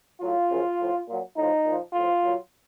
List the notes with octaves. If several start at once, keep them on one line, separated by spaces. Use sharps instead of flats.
A2 F#3 F4
F#2 C#3 F3
A2 F3
A#2 F#3
A2 F3 D#4
A#2 F3
A2 F3 F4
A#2 F#3